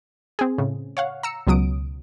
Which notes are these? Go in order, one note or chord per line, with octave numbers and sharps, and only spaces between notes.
C4 G#4
A2 C#3
C#5 F5 F#5
A#5 E6 C#7
C#2 B2 F#3 D#6 D7